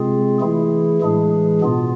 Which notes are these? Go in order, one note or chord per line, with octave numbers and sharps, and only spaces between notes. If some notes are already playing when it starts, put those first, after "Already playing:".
Already playing: C3 G#3 C4 F4 G#4
E3 A3 E4 G#4
A2 E3 G#3 D4 G#4
B2 B3 F4